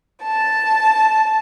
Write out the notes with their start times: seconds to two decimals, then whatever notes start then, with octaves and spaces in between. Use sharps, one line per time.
0.23 A5